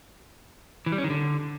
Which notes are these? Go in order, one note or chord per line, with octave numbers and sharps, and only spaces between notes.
E3
G3
C#4
D#3
D3